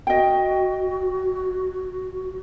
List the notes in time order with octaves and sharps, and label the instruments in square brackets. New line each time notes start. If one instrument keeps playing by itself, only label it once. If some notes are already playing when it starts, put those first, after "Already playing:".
[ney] F#4 [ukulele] D#5 G5